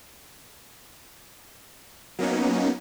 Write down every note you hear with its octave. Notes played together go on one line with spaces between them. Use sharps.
F#3 A#3 B3 C#4 D#4